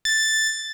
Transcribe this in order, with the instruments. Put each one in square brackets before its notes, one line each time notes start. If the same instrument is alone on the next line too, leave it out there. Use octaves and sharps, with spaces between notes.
[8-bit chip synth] A6